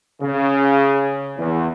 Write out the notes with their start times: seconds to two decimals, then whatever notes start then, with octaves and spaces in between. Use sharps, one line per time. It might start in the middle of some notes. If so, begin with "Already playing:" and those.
0.22 C#3
1.37 E2